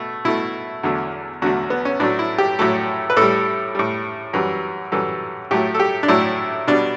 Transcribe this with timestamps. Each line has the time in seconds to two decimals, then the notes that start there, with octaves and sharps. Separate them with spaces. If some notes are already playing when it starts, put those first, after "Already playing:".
Already playing: B2 A3
0.25 B2 A3 E4
0.83 E2 D3 F#3 A3
1.42 E2 D3 F#3 A3 F#4
1.70 B3
1.85 C#4
2.00 A2 F#3 A3 D4
2.19 E4
2.38 G4
2.59 A2 F#3 A3 A4
3.10 B4
3.17 A2 G3 A4
3.75 A2 G3
4.33 F#2 E3 G3
4.92 F#2 E3 G3 A4
5.51 A2 F#3 A3 G4
5.74 A4
5.80 G4
6.03 D4
6.08 A2 F#3 A3 E4
6.67 B2 G3 D4